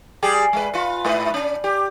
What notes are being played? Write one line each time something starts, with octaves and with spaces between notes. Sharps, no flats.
G3 G4 G#4
G#3 B4
F4 B4
G#2 B4
C#4 D4
G4